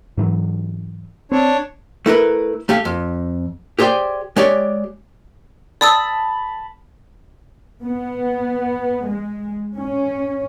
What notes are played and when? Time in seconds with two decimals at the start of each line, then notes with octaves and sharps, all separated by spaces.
0.17 G#2 E3 F#3
1.32 C4 D4 C#5
2.06 A3 E4 A#4 B4
2.69 A3 G4 F5
2.85 F2
3.79 G4 G#4 C5 D5 G5
4.36 G#3 G4 C#5 D5
5.81 D5 A5 B5 D#6 E6
7.83 B3
9.07 G#3
9.76 C#4